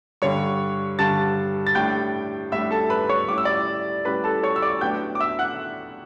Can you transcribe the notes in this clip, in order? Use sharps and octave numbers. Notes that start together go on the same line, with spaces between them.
G2 D3 G3 C#5 C#6
G2 D3 G3 A5 A6
A6
A2 G3 D4 G5 G6
A2 G3 D4 E5 E6
A4 A5
B4 B5
C#5 C#6
A2 G3 C#4 E4 D6
E6
D5 D6
A2 G3 C#4 E4 B4 B5
A4 A5
C#5 C#6
E6
D5 D6
A2 F#3 B3 D4 G5 G6
D6
E5 E6
F#5 F#6